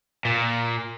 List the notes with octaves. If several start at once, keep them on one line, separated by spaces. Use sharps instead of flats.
A#2